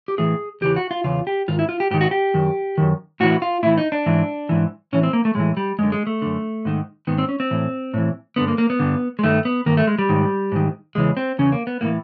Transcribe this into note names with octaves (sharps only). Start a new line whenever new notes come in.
G4
A2 E3 G#4
E2 C#3 E3 G4
F#4
F4
E2 C#3 F4
G4
G#2 D#3 F4
E4
F4
G4
G#2 D#3 G4
F#4
G4
F#2 D#3
F#2 D#3
A2 E3 F#4
F4
A2 E3 E4
D#4
D4
G#2 E3
G#2 E3
A2 E3 C#4
C4
A#3
A3
A2 E3 G#3
G3
F#2 D3 G#3
G#3
A3
F#2 D3
G#2 D#3
G#2 D#3 B3
C4
C#4
C4
A2 E3
A2 E3
G2 D3 B3
A#3
A#3
B3
G2 D3
G#3
G2 D#3 A3
B3
G2 D#3 A#3
A3
G#3
G3
G#2 D#3
G#2 D#3
E2 C#3 E3 G#3
C4
E2 C#3 C#4
A#3
B3
A2 E3 A#3